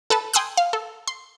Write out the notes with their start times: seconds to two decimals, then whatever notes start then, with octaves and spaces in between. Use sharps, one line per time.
0.10 A4 B4 A5
0.33 G5 G#5 C6 D#6 E6 F#6
0.57 F5
0.73 A4
1.08 C6